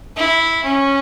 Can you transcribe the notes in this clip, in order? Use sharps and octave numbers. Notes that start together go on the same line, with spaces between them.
E4
C#4